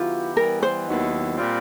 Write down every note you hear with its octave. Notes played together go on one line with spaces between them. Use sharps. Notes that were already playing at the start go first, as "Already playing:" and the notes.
Already playing: D#3 F#3 B3 E4 F4 G4
E3 G3 B3 A#4
C5
D#2 D#3 F#3 B3 E4
A#2 G3 C4 F4